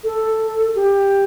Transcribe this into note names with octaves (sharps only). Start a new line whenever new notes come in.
A4
G4